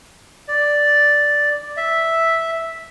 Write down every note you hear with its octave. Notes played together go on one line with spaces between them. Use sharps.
D5
E5